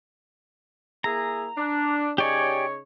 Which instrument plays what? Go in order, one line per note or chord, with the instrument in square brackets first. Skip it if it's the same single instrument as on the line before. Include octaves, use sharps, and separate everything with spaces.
[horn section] A#3 E4 G#4 [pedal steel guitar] A#5
[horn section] D4
[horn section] C#3 D#4 C#5 [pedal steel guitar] G4 D5 G#5